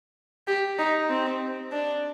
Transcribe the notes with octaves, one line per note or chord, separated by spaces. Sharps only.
G4
D#4
C4
D4